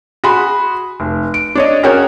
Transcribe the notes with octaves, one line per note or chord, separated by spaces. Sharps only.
F#4 G#4 B5 C6
F1
D7
D4 C#5 D#5
C#4 F#4 G#4 A#4 C#5 G5